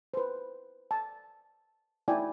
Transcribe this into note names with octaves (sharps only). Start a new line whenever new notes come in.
B4 C5
A5
D#4 E4 F#4 D5 G5 G#5